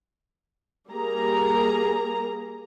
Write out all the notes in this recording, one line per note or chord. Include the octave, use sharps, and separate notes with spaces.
G3 A#3 G#4 A#5